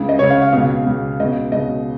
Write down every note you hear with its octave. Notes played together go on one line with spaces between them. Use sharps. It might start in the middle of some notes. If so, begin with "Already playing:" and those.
Already playing: C#2 C#3
D#5
C#2 C#3 C#5
F5
F5
C#2 B2 F5
C#2 B2
C#2 B2 D#5
C#2 B2 D#5